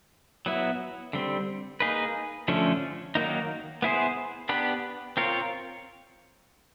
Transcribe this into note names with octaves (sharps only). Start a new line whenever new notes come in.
F#3 B3 E4
D3 G3 C4
A#3 D#4 G#4 B4
D3 F3 A3 C#4
D#3 F#3 A#3 D#4
B3 E4 G#4 C5
B3 D4 G4 B4
C4 F4 A#4 C#5